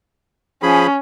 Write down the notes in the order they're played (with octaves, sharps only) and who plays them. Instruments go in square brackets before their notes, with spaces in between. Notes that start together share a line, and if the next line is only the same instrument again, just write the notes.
[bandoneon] F3 G#4 B5 [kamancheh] C#4